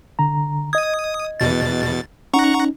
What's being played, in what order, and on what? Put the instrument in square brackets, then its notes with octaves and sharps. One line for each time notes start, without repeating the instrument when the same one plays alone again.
[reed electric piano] C2 D3 A#5
[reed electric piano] D#5 G#6 [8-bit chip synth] D#6
[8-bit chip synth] E2 B2 A6
[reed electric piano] C#4 D#4 [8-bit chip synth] F#5 A#5 C#6